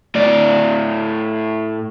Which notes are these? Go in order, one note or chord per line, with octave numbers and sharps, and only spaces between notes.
A2 D5